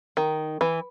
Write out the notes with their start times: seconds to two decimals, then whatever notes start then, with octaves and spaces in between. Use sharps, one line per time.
0.17 D#3
0.61 E3